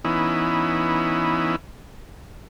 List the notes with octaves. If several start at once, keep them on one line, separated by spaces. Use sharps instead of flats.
E3 B3 C#4 D#4 E4